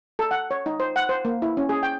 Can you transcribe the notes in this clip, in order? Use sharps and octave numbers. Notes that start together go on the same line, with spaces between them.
A4
F#5
C#5
D#4
C5
F#5
C5
A#3
E4
C#4
G#4
G5